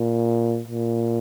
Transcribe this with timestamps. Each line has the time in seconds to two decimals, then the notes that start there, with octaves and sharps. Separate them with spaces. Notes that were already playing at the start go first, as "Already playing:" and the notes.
Already playing: A#2
0.68 A#2